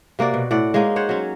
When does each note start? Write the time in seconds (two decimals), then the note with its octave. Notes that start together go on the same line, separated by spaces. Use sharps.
0.19 C3 A#3 F#4 D5
0.34 B2
0.51 A2 D5 F#5
0.74 G#3 A#3 C#4 D#4
0.96 C5 C#5 F#5
1.09 F#3 C#4